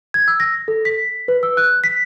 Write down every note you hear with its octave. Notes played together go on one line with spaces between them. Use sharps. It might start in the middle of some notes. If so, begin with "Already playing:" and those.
G#6
E6
A#6
A4
B6
B4
E6
F#6
B6